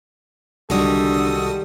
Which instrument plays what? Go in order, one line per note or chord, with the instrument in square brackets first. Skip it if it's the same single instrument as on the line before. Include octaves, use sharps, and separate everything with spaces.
[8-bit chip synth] C2 F#4 D#6 [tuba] D3 [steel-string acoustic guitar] D#3 G3 G#3 [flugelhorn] A4